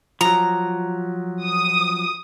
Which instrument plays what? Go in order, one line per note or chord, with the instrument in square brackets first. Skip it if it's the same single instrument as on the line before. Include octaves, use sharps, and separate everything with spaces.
[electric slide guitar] F3 F#3 [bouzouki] A#5
[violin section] D#6